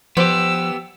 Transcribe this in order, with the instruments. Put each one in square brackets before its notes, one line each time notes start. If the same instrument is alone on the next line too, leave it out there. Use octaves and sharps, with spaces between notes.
[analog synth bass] F3 [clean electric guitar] B3 G4 [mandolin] B4 C5 D5 [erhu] E6